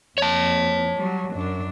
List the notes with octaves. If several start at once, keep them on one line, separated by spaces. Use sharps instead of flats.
F2 C#5 A5
F#3 G3
F#2 D4